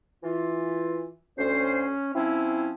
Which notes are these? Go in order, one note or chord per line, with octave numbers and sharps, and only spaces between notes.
E3 F4
D2 C#4 C5
F3 C4 C#4 E4